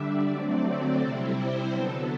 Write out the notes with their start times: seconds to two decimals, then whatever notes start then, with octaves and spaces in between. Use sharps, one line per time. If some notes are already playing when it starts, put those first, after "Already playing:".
Already playing: D3 G3 D4 D5 E5
0.27 D3 F#3 A3 C4
1.00 C3 G3 C4 E4
1.36 C5
1.72 D3 F#3 B3 A4